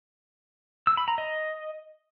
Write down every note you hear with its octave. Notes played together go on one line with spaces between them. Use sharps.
E6
B5
A#5
D#5